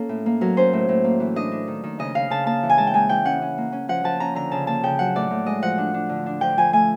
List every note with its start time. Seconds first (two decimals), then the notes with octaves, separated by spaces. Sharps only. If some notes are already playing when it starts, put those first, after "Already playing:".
Already playing: A#3 C#4 A4
0.09 A2
0.26 A#3
0.41 F#3 A#4
0.57 C#4 C5
0.73 A2
0.89 A2
1.04 A#3
1.20 E3
1.36 D4 D#5
1.52 D4
1.68 D#3
1.84 D#3
1.99 C#3 D#5
2.15 C#3 F5
2.30 C#3 A5
2.46 A#3 A5
2.63 E3
2.70 G#5
2.78 G#3 A5
2.87 G5
2.94 G#3 G#5
3.09 E3 G5
3.25 C#4 F#5
3.42 C#4
3.58 A#3
3.72 C#4
3.89 F3 F#5
4.04 F3 A5
4.20 C#4 A#5
4.35 D3 A#5
4.51 C#3 A5
4.67 A#3 A5
4.83 C#3 G5
4.99 F#3 F#5
5.15 A2 D5
5.30 A2
5.46 G#3 D#5
5.62 F3 F#5
5.78 D4
5.94 D4
6.09 D3
6.26 D4
6.41 F3 G5
6.57 F3 G#5
6.73 A3 G#5